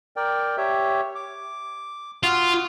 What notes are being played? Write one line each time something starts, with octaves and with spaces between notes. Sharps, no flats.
A#4 D5 G5
G4 C#5 E5
D6
F4 F#4 F#5 D#6